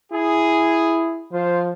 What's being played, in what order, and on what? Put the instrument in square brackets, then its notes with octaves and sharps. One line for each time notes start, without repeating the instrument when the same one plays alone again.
[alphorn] E4 [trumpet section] G#4
[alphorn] F3 [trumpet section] F4 C5